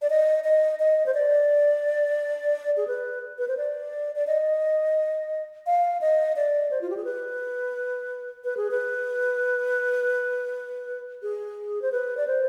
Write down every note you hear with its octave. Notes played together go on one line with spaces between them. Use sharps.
D5
D#5
D#5
D#5
C5
D5
G#4
B4
B4
C5
D5
D5
D#5
F5
D#5
D5
C5
F4
G4
G#4
B4
B4
G#4
B4
G#4
C5
B4
D5
C5